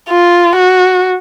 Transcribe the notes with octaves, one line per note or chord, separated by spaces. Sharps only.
F4
F#4